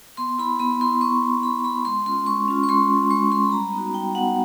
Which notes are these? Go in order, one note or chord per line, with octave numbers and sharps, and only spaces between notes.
B3 C6
E4 B5
B3 B5
E4 C6
B3 C#6
E4
B3 B5
E4 B5
G#3 C6
C#4 F4 C6
G#3 C#6
C#4 F4
C#6
G#3 C6
C#4 F4
G#3 C#6
C#4 F4 C6
B5
G3 A#5
B3 D#4 F#4
G3 G5
B3 D#4 F#4 F#5